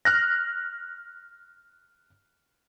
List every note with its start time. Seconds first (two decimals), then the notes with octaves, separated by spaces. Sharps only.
0.05 F6 F#6 A#6